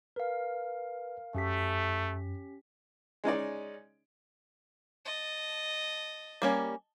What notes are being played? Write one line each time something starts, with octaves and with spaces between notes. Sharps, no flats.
A#4 B4 F5
F#2 A3 C#4 G4 B6
G#3 C#4 D#4 D5
D#5 A5
G3 A#3 C#4